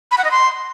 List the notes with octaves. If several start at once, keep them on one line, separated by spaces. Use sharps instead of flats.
B5
F#5
D#5
C6